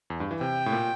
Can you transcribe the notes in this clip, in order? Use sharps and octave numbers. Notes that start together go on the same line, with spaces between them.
E2
G2
E3
C3 G5
A2
A#2